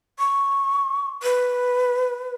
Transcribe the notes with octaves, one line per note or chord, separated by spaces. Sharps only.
C#6
B4